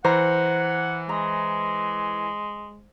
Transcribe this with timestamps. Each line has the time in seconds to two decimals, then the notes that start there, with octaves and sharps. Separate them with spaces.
0.05 E3 C5 F#5 A#5
1.09 G#3 A#5